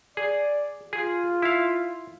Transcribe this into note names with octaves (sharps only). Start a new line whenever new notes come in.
G#4 D5
F4 G#4
E4 F5